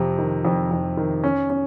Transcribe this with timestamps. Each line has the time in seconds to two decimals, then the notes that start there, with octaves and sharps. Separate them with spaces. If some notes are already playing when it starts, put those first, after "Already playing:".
Already playing: F2 C3
0.18 D#3
0.45 F2
0.71 F2
0.97 D#3
1.24 C#4
1.50 C#4